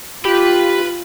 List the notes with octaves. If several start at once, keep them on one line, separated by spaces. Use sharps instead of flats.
F4 G4 B4 B5